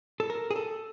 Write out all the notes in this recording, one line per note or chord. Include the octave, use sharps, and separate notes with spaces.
A4
A#4
G#4
A4